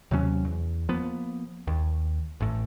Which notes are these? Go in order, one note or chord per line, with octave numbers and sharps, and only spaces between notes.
D#2 C3 F#3 C#4
E2
F3 A#3 B3
D#2
A1 A2